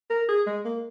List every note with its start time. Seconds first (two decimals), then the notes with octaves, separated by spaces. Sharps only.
0.10 A#4
0.29 G#4
0.47 G#3
0.65 A#3